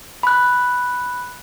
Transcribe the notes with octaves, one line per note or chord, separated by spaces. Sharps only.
B5 F#6